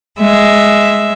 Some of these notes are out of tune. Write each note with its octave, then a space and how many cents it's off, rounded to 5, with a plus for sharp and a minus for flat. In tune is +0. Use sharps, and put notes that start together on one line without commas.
G#3 +0 E5 +0